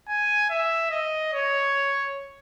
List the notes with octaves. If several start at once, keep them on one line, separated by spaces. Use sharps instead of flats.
G#5
E5
D#5
C#5